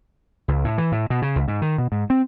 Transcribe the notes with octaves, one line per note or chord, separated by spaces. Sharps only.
C#2
A2
E3
A2
B2
C#3
C#2
G#2
D#3
B2
G#2
C4